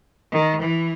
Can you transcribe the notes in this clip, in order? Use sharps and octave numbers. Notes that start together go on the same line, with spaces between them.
D#3
E3